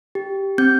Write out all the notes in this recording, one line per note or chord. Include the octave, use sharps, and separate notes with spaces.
G4
C4 G6